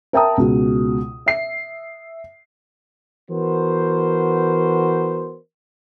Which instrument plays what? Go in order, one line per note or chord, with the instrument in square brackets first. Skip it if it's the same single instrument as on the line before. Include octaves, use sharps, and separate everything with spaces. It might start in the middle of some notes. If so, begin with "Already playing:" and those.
[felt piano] A#4 E5 G5 A5 A#5 D#6
C#2 B2 F#4
E5 C7
[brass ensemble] E3 B3 F#4 A#4 C5